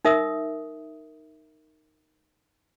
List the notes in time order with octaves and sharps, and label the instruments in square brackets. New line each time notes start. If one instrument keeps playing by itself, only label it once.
[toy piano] D#4 A#4 E5 D#6